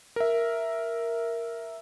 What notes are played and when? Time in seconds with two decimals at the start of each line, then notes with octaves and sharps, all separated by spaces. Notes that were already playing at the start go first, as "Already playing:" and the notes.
0.16 A#4 E5